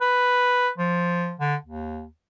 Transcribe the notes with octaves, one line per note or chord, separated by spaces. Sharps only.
B4
F3
D3
D#2